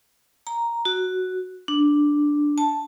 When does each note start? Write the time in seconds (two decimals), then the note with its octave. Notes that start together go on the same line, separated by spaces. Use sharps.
0.47 A#5
0.85 F#4
1.68 D4
2.58 A5